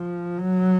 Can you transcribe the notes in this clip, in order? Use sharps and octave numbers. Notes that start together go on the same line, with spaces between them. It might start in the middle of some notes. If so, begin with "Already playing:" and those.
Already playing: F3
F#3